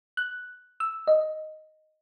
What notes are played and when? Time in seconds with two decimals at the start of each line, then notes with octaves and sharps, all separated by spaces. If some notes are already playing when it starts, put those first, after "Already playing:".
0.17 F#6
0.80 E6
1.07 D#5